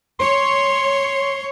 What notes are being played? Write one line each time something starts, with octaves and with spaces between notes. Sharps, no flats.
C#5 C6